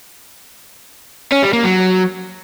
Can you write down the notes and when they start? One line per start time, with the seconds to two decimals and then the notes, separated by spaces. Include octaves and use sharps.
1.32 C#4
1.43 G3
1.53 A#3
1.64 F#3